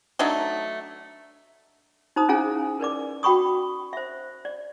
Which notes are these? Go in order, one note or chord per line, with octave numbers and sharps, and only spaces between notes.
F#3 A3 D4 D#4
D#4 C5 A#5 D#6
C#4 E4 G#4 F5 G#5 A#5
A#4 B4 D5 D6
F#4 G5 B5 C#6 D#6
C5 E5
D5